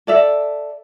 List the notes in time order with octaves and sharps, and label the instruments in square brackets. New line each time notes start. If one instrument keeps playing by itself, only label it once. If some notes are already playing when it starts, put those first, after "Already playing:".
[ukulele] A4 D5 E5